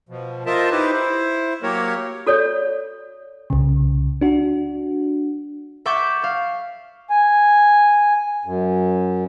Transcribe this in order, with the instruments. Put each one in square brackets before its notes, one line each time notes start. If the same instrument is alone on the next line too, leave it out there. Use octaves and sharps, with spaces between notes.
[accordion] B2 F3
F4 A#4 C5 D#5 E5 A5
D#4 E4 G4 B4 C5
E4 C5
F#3 A#3 G4 A#4 C#5
[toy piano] F#4 A4 C#5 D5
[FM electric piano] C2 C#3
D4 F#4
[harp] E5 F#5 C#6 D6 G6 A6
F5
[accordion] G#5
F#2